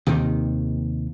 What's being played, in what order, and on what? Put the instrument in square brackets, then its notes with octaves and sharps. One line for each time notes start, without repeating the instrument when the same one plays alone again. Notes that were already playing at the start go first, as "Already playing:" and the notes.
[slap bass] D#2 C3 D#3